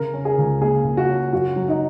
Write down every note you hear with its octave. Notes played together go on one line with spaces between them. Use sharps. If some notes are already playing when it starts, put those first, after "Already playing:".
Already playing: C#3 A#4
C#4
G#4
C#2
A#3 G#4
C#3
F#4
C#4
F#2 F#4
F#3
D#4